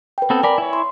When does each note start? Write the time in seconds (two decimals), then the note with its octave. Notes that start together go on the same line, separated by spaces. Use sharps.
0.18 B4 G5
0.30 B3 C4 A4
0.43 A#4 D5 G#5 B5
0.58 E4 C#5
0.73 C6